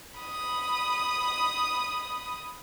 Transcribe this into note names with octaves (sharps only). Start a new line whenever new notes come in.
B5 D#6